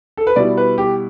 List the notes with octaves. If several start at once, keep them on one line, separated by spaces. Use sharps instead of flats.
A4
B4
B2 G3 E4 D5
B4
G4